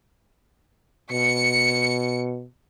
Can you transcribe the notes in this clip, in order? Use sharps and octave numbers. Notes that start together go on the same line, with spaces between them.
B2 C#7